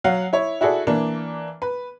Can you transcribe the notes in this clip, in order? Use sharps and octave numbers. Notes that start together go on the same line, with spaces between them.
F#3 F5 F#5
E4 C#5
E4 F#4 G#4 A4 D5
E3 A#3 D4
B4